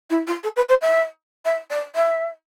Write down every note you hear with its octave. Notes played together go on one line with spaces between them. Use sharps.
E4
F4
A4
B4
C5
E5
E5
D5
E5